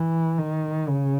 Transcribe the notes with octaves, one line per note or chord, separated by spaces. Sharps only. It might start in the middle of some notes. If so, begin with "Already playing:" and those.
Already playing: E3
D#3
C#3